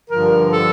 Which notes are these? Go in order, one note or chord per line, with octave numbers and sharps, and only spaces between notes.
G2 D3 F3 A#4
A4